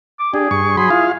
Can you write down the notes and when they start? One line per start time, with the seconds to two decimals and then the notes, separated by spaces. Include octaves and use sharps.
0.19 D6
0.34 D4 G4 G#4
0.51 G2 C#6
0.77 F#3 G#4 B5 C6
0.90 E4 F4 F5